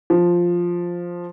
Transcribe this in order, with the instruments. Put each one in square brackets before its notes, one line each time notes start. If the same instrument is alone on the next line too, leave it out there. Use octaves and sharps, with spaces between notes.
[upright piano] F3